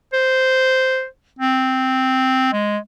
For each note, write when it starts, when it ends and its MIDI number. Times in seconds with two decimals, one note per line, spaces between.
0.13 1.05 72
1.39 2.51 60
2.53 2.78 56